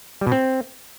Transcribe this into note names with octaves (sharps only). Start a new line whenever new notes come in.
G3
B2
C4